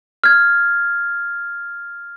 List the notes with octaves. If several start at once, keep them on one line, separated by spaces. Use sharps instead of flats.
F6 G#6